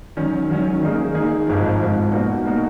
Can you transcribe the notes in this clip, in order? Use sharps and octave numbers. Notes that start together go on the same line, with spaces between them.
D#3 F#3 C#4
D#3 F#3 C#4
D#3 A#3 D#4 G#4
D#3 A#3 D#4 G#4
G#1 G#2 F3
G#1 G#2 F3
B2 A#3 D#4 F#4
B2 A#3 D#4 F#4